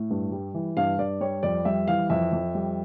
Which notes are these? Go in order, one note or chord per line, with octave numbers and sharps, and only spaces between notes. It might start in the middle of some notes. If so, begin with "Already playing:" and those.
Already playing: A2
G2
G3
E3
G2 F5
G2 D5
G3 C#5
F2 D5
G3 E5
E3 F5
F2 E5
F2
G3